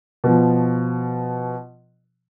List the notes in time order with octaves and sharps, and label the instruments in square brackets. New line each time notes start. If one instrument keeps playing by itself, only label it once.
[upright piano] B2 F3